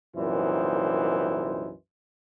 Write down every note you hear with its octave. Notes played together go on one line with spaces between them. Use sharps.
C2 F#2 A#2 E3 D#4 C5